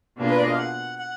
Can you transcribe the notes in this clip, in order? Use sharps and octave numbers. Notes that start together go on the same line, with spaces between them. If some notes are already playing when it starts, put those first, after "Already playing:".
B2 A#3 D4 F4 G#4
B4
D5
D#5
F5
F#5
F#5